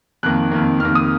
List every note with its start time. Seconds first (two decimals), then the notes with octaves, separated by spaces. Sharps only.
0.23 F2 D#3 A#3 F#6
0.52 F2 D#3 A#3
0.80 F2 D#3 A#3 F6
0.95 D#6